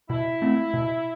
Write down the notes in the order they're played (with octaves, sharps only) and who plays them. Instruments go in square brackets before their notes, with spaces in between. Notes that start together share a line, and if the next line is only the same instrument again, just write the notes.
[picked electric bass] B2 [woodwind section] E4
[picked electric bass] A3 C4
B2